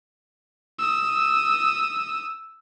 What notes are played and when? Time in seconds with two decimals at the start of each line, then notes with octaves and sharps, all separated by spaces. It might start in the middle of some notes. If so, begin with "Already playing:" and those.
0.78 D#6 E6